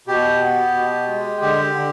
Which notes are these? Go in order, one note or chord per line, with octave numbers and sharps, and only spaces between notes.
B2 G4
B3
B2
G#3
D3 G4
D3